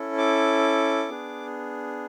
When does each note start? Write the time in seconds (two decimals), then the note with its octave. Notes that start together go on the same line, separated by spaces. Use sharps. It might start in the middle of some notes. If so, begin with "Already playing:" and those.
Already playing: C#4 E4 A4
0.18 D6
1.09 B3 D4 G#4